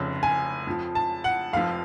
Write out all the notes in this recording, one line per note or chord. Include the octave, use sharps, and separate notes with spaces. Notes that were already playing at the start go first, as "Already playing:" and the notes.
Already playing: F1 F2 C#3
G#5
F2 F3
A5
F#5
F1 F2 F3 F5